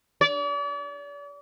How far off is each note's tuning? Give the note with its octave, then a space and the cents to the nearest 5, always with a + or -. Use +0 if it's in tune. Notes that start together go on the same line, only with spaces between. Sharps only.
D5 -40